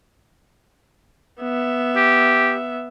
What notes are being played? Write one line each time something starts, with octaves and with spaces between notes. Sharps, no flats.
B3 E5
G4